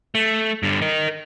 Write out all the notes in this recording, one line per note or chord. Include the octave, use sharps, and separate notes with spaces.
A3
G2 D3
A#4 D#5